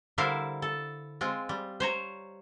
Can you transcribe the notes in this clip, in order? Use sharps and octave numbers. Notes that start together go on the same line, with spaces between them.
D3 G3 E4 A#4 C5 F5
A4
G#3 C4 F4
G3
C5 C#5 A#5